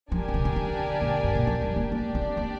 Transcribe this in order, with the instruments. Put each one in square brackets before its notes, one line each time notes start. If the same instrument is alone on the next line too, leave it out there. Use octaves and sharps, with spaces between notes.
[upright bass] F3 [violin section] D4 G4 A#4 D5 G#5
[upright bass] D3
C3
D3
D3
A#2
G2
A#2
F3
G3
A#3
[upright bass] A#3 [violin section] D4 G4 D5
[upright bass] C4
A#3